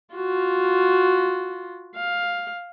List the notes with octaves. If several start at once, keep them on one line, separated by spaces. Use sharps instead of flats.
F4 F#4
F5